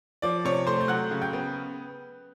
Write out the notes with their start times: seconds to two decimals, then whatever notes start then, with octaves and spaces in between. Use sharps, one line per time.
0.22 F3 D5 D6
0.45 C3 C#5 C#6
0.67 A3 C5 C6
0.81 G6
0.88 F#3 F#5 F#6
1.11 C#3
1.21 G5 G6
1.33 B3